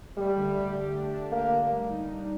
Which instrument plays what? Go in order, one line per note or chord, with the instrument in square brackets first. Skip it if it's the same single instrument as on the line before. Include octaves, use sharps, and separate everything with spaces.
[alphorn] G3 [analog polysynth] A3
[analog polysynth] D3
G4
G4
D4
D4
[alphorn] A#3 [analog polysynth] G4
[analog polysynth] D4
G3
D#4
G3